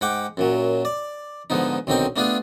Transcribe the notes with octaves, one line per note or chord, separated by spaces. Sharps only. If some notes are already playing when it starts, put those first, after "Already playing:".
G#2 F#5 G5 D6
F#2 A#2 F#3
D5
G#2 D3 F3 B3 D#4
B1 D3 D#3 C4 D#4 G5
A3 B3 D4 F4 G#4